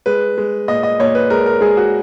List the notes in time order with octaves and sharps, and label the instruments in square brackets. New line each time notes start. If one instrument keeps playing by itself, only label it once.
[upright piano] G#3 B4
G#3
A#2 D#5
D#5
A#2 C#5
B4
G#3 A#4
A#4
G#3 G#4
F#4